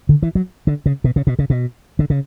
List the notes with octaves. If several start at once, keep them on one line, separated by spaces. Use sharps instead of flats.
D3
E3
F#3
D3
C#3
B2
C#3
B2
C#3
B2
D3
C#3